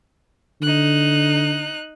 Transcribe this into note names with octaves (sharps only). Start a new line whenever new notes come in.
D3 D#4 F#6